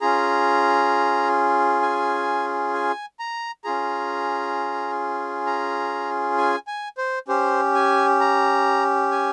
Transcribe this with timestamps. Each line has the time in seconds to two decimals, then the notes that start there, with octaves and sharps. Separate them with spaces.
0.01 C#4 F4 G#4 A#5
1.82 G#5
2.74 G#5
3.19 A#5
3.64 C#4 F4 G#4 A#5
5.46 A#5
6.38 G#5
6.67 G#5
6.98 C5
7.28 C#4 G4 C5
7.74 G#5
8.20 A#5
9.11 G#5